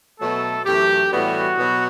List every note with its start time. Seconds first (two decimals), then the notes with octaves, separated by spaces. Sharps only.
0.19 B2 F#3 A3 A4
0.65 F#2 E3 A3 G4
1.11 A2 E3 G3 B3 F#4
1.57 B2 F#3 B3